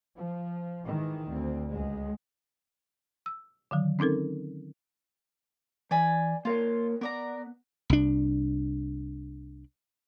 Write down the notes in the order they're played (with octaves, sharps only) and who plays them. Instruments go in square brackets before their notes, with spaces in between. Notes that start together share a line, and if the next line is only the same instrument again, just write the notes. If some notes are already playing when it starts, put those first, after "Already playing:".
[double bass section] F3
G#2 D#3 E3
D2 C4
C#2 G#3
[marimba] E6
D3 D#3 F#3
C4 C#4 D#4 A4 A#4
[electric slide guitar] E3 [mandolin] D5 G#5 B5
[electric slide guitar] A#3 A#4 C#5 [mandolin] F4
[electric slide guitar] B3 [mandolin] A#4 D5 A#5
[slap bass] C2 D4